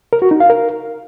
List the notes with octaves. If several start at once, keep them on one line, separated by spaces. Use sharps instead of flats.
A#4
F#4
D#4
F5
A#4